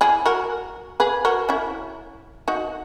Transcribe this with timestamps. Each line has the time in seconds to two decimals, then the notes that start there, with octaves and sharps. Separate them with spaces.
0.01 E4 G#4
0.26 F#4 A#4
1.00 G#4 B4
1.25 F#4 A#4
1.49 C#4 E4
2.48 D#4 F#4